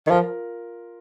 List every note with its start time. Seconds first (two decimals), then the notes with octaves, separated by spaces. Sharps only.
0.07 D#3
0.10 F3 F4 A#4